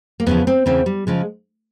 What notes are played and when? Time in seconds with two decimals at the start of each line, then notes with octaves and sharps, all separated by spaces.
0.20 A#3
0.26 E2 C#3 F3 B3
0.47 C4
0.66 E2 C#3 E3 C4
0.86 G3
1.07 C#3 F3 G#3